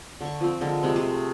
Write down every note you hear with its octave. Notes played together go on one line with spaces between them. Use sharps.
D3 C#6
F3 C4
D3 G#3 A#4
C3 G#3 A3
A3 G#4